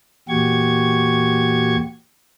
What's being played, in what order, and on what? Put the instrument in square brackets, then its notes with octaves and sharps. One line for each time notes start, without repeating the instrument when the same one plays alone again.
[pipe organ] E2 A#2 F#4 G4 C#6 G#6